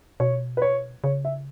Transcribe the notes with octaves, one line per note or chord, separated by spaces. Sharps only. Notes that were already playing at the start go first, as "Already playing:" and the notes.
B2 C#5
B4
C#5
C#3 C#5
E5